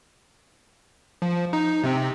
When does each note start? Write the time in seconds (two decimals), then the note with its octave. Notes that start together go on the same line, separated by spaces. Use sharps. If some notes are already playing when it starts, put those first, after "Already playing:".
1.22 F3
1.53 D#4
1.84 C3 C4